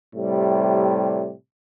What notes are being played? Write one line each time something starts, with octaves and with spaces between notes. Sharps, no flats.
A2 C3 G3